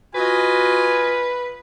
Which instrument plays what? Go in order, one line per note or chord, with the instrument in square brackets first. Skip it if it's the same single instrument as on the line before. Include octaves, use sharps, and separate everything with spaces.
[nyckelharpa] F4 D#5 [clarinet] F#4 [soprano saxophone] B4 [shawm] G#5